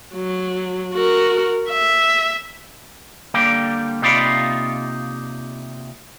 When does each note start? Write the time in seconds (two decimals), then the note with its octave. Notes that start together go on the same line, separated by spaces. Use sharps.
0.14 F#3
0.94 F#4 A#4
1.70 E5
3.34 D3 G3 A#3 G5
4.02 C3 A#3 D#4 F4 D5 B5